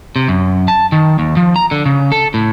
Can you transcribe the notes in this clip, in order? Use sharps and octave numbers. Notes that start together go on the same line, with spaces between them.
C3
F#2
A5
D#3
D#2
F3
A#5
D3
C#3
A4
A2